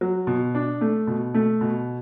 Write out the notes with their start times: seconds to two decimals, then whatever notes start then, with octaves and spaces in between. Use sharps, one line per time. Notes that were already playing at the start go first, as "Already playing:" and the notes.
0.01 F#3
0.27 B2
0.55 D4
0.81 A3
1.07 B2
1.34 A3
1.61 B2